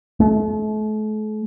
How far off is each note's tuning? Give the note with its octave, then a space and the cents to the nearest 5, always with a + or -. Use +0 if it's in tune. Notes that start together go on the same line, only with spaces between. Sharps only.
A3 -40